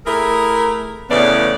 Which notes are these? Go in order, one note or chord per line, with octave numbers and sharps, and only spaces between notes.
A3 E4 G#4 A#4
E2 A2 C#3 E3 B3 D5